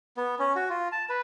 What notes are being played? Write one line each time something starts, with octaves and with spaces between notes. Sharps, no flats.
B3
C#4
F#4
F4
A5
B4